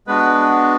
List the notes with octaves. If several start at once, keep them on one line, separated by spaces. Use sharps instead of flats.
G#3 B3 D4 F#4 B4